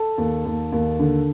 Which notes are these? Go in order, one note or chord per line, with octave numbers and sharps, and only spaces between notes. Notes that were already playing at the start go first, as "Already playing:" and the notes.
Already playing: A4 A5
D#2
D#2
D#2
D3